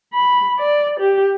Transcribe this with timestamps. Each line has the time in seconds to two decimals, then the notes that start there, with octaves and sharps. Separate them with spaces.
0.14 B5
0.59 D5
1.00 G4